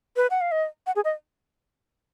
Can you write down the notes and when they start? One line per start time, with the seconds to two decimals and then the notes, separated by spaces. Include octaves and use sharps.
0.16 B4
0.30 F#5
0.41 F5
0.52 D#5
0.87 F#5
0.96 G#4
1.05 D#5